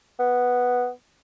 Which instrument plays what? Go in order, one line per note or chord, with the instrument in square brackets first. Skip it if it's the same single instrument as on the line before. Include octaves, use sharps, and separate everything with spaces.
[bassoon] B3